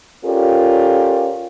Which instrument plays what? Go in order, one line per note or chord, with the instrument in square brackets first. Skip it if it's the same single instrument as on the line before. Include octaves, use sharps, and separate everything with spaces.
[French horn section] C#4 F4 G4 A4 A#4 D5